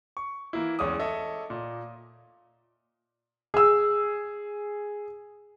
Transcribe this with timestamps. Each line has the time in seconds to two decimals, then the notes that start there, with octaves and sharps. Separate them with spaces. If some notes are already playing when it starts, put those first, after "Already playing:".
0.17 C#6
0.53 E3 A#3 E4
0.79 D1 E2 G#3 C#4 D6 D#6
0.99 A4 C#5 D#5 E5
1.50 A#2
3.54 G#4 E6